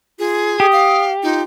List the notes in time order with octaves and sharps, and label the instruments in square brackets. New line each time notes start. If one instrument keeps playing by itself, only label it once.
[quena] F4 [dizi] G#4
[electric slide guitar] G4 [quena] D#6
[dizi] F5
[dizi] D#4 [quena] F4